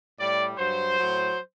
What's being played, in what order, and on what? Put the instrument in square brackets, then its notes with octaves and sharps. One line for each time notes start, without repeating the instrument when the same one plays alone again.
[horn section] A2 G3 D5
G2 F#3 C5
A2 F#3